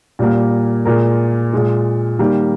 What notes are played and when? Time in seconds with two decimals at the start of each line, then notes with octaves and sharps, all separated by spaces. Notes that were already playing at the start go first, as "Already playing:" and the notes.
0.19 A#2 G3 A#3
0.85 A#2 G#3 A#3 A#4
1.53 A#2 G#3
2.19 D#3 G3 A#3